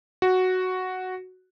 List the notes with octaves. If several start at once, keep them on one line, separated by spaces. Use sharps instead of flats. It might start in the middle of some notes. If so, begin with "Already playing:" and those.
F#4